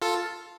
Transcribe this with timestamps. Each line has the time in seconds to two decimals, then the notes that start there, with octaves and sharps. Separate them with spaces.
0.02 F4 A4